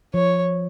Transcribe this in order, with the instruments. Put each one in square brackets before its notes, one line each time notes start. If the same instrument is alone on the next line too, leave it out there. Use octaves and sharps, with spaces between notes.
[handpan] F3 [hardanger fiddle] C#5